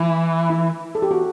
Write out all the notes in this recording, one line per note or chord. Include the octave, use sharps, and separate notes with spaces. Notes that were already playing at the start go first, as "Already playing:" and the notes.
Already playing: E3 E4
E4
A4
G4
F#4